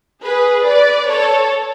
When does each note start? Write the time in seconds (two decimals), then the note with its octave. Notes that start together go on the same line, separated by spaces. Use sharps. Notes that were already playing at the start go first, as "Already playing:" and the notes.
0.24 G#4 B4
0.66 B4 D5
1.08 A4 C#5